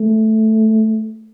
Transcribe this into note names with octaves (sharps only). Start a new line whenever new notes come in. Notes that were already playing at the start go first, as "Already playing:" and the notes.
Already playing: A3